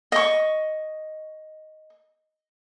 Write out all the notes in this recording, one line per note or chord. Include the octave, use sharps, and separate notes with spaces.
D#5 C#6